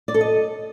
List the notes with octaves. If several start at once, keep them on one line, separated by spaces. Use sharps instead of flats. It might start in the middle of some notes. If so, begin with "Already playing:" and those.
D5
A4
D#5